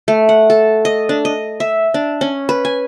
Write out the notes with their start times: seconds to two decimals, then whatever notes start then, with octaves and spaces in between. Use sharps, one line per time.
0.08 A3
0.29 F#5
0.50 A4
0.85 D#5
1.09 D4
1.25 D#5
1.60 E5
1.94 D4
2.21 C#4
2.49 B4
2.65 G#5